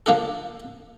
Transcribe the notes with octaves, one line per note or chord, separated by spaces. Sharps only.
D3 F3 A#3 D4 A4